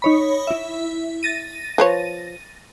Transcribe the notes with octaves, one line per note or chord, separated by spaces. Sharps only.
D#4 C#5 B5
E4 E5
A6 A#6 D#7
F3 B4 C#5